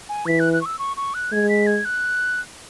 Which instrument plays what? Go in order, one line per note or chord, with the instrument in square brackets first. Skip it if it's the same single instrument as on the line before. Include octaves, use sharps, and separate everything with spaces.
[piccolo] G#5
[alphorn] E3 [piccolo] B6
[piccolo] F#6
F#6
C#6
E6
C#6
C#6
F#6
[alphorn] G#3 [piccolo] G#6
[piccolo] B6
G#6
F#6